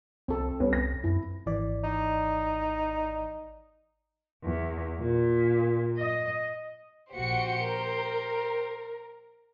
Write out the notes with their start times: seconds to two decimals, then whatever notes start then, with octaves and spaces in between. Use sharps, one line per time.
0.28 C2 C4 A4
0.60 C2 G3 B3 C#4
0.73 A#6
1.04 F#2 E4
1.46 G#1 E3 D5
1.84 D#4
4.44 E2
4.99 A#2
5.98 D#5
7.12 A#1 F#4 G4 C5 C#7
7.62 A#4